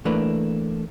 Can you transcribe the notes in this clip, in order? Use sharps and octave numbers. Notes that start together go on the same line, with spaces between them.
E3 A3 A#3 D4 B4